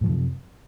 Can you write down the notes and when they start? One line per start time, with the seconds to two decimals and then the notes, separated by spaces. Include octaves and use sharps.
0.01 A2
0.04 F3
0.06 F#2
0.09 C3